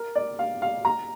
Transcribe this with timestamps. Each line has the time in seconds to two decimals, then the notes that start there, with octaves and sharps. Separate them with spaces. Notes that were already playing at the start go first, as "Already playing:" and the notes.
Already playing: A#4
0.15 D5
0.39 F5
0.62 F5
0.85 A#5